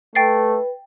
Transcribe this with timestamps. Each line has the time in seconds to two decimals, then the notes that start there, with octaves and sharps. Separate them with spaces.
0.15 A3 B4 G5 A6 C7